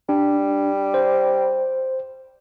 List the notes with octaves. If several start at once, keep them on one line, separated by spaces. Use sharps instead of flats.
G3 D4
C5